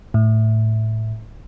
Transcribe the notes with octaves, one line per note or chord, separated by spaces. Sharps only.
A2